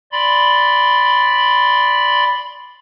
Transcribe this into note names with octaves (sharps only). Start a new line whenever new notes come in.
D5 B5 C6